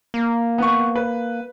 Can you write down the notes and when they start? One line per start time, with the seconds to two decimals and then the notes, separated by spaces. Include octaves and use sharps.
0.14 A#3
0.58 B3 C#6
0.95 B4